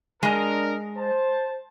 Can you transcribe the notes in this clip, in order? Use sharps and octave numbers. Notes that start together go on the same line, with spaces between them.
G#3 D4 A#4 D#5
C5 A5